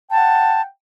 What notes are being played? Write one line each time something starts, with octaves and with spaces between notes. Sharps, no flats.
F#5 G5 A5